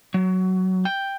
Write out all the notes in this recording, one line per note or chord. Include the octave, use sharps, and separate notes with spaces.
F#3
G5